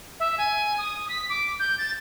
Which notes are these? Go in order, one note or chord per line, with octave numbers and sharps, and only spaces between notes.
E5
G#5
D#6
B6
D6
G6
A6